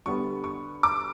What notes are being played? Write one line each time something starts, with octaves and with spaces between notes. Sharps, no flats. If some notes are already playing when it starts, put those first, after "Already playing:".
D3 G3 B3 C#6
C#6
D6